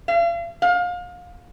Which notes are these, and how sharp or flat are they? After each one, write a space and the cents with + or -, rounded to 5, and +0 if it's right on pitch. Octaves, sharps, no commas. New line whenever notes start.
F5 -40
F5 +30